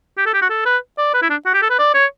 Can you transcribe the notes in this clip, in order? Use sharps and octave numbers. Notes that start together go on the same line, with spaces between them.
G4
A4
G4
F#4
A4
B4
D5
B4
E4
D4
F#4
G4
A4
B4
D5
C#5